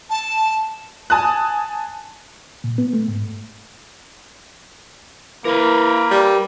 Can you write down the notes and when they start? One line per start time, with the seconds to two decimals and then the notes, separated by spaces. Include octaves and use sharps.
0.10 A5
1.10 G#5 A5 D#6 F#6
2.64 A#2
2.78 B3
2.93 A3
3.08 G#2
5.45 E3 A#3 A#4 B4
6.11 G3